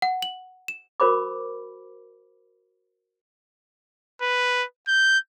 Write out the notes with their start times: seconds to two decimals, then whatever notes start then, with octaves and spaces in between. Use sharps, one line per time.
0.02 F#5
0.22 F#7
0.68 E7
1.00 F#4 A#4 C5 B5 D6
4.21 B4
4.88 G6